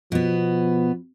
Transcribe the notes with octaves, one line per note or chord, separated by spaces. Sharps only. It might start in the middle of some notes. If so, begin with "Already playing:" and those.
B2 F3 B3